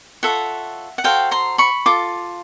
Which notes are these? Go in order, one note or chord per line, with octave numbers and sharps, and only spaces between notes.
F4 A4 C#5 E5 F#5
F#5
F#4 A4 C5 F5 G5
A#5 C6
B5 C#6
F4 A4 D6